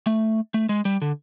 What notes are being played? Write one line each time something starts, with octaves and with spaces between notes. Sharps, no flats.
A3
A3
G#3
G3
D3